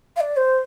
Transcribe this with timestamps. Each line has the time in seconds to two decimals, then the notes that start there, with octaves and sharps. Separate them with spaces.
0.16 F5
0.20 D5
0.37 C5